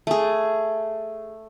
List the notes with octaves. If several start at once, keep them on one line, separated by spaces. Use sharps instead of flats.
A3 G#4